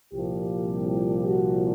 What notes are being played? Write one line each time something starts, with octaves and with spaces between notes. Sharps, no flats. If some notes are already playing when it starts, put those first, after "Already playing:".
C2 A#2 F3 G4
G4
F#4